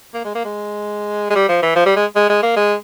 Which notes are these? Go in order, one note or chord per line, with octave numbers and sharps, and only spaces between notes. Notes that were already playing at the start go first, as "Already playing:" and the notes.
A#3
G#3
A#3
G#3
G#3
G3
F3
E3
F3
G3
G#3
G#3
G#3
A#3
G#3